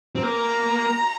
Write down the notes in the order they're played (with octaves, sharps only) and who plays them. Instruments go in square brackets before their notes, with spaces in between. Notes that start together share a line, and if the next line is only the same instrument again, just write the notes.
[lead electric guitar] C4
[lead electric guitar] A#3 [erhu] A#5